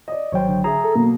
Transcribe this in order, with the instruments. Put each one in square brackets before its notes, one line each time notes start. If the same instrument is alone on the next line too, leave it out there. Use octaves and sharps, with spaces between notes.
[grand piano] D5 D#5
[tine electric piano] G#1 F#3 G5 [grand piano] C5 C#5
[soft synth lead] D3
[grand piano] G#4 E5 [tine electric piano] A#5
[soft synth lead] A4
[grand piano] B2 F#3 [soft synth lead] A#3